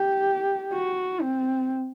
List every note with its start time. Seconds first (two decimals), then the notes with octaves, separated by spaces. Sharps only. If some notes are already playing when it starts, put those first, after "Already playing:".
Already playing: G4
0.73 F#4
1.22 C4